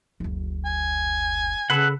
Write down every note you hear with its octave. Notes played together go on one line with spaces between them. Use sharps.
F#1 D2
G#5
C#3 A4 B4 F#5